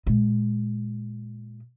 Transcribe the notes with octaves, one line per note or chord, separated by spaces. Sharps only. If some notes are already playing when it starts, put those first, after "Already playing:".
A#2 G#3